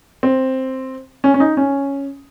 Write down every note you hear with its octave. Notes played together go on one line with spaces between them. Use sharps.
C4
C#4
C#4
D#4
C#4